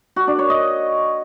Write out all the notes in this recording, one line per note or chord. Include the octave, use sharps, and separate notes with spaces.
F#4
D4
C#5
D#5